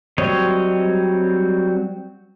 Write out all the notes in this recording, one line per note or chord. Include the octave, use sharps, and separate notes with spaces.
F#3 G3 C4 C#5 D#5